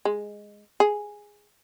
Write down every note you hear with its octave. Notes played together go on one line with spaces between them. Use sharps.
G#3
G#4